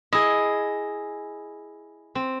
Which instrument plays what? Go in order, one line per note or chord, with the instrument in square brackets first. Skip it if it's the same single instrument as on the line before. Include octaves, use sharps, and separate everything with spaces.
[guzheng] E4 G#4 [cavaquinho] D#5
[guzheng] C4